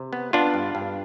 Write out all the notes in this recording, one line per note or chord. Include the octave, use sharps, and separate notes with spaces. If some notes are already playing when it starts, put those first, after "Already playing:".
Already playing: C3
B3
B3 D4 F4
G2
G2